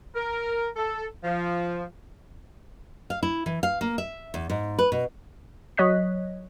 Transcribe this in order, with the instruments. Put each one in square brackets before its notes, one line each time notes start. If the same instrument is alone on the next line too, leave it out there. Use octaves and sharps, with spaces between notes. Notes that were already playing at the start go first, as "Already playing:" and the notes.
[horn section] A#4
A4
F3
[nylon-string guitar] F5
E4
E3
F5
A#3
E5
E2
G#2
B4
B2
[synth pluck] F#3 C#5 D#5 F#6 B6